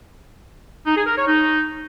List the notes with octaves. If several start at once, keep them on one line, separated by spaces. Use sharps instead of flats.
D#4
G#4
A#4
C#5
D#4